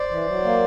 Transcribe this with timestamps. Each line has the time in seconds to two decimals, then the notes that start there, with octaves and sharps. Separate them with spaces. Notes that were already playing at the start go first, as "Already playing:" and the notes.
Already playing: C5 D5
0.11 E3
0.27 F#3
0.44 A#3